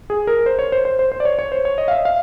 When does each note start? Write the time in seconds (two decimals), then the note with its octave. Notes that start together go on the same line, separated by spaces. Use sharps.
0.10 G#4
0.27 A#4
0.46 C5
0.59 C#5
0.72 C5
0.85 C5
0.99 C5
1.12 C5
1.20 D5
1.25 C#5
1.39 C#5
1.52 C5
1.65 C#5
1.78 D#5
1.88 F5
1.91 E5
2.05 F5